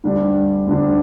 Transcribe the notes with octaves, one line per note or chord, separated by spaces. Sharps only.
D2 D3 G3 D4
D2 D3 G3 D4